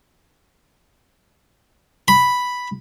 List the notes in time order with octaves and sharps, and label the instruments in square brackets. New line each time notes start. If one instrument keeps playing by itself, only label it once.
[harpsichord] B5